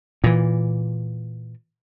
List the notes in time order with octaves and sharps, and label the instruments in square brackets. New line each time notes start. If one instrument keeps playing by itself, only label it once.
[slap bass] A#2 E3